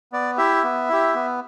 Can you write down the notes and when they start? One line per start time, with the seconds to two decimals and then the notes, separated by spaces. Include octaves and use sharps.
0.12 B3 D5
0.37 E4 G4 E5
0.64 B3
0.89 E4 G4
1.15 B3